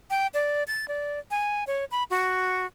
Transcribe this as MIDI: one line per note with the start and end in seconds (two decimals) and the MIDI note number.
0.10 0.27 79
0.34 0.64 74
0.68 0.88 93
0.88 1.19 74
1.31 1.64 80
1.67 1.85 73
1.91 2.04 83
2.10 2.66 66